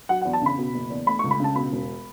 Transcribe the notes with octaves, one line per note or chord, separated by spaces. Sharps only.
F#3 F#5
F#5
E2
A5
C#3 B5
B2
F#1
E2
A3 B5
C#6
C#2
B5
C#3 A5
B2 B5
E1